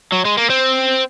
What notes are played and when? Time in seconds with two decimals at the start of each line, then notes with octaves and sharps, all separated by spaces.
0.12 F#3
0.25 G#3
0.37 A#3
0.50 C4